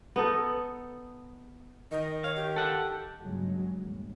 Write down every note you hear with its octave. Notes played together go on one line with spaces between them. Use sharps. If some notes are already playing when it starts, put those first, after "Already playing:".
B3 D#4 A4
D#3 D#5
C#5 F5
G4
A4 F#5
G2 A#2 C#3 F#3 G#3
G1 D#2